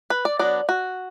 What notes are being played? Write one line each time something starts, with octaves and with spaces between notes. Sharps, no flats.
B4
D5
F#3 B3 D4 D5
F#4